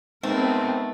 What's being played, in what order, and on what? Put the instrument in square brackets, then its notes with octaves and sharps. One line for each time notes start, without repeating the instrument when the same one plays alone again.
[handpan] G#3 D#4 [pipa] A3 [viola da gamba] B3 A#4 [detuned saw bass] C4